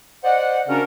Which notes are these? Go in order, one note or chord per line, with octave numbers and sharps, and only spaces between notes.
C5 D5 D#5 F#5
C#3 C#4 D4 F#4 A#4